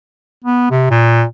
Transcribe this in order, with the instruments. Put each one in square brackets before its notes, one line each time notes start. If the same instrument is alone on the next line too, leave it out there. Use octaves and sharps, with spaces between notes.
[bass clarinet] B3
C3
A#2